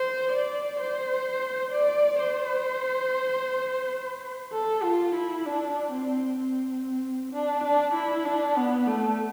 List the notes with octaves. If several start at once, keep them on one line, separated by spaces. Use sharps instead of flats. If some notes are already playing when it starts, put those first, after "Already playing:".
Already playing: C5
D5
C5
D5
C5
A4
F4
E4
D4
C4
C4
D4
D4
E4
D4
B3
A3